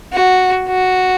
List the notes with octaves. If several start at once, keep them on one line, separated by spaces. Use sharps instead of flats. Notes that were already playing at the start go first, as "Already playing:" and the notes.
F#4
F#4